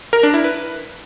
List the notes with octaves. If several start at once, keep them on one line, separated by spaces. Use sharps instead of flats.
A#4
D4
E4
B4